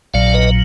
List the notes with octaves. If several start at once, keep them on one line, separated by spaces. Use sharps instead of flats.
A#1 A#2 F#3 D5 F5
B4 D#5